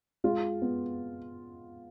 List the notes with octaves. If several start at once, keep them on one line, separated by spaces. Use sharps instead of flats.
G#3 F4
B3